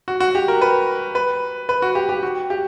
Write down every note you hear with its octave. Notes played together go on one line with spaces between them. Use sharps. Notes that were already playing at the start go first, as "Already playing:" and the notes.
F#4
F#4
G4
A#4
B4
B4
B4
F#4
G4
G4
F#4
G4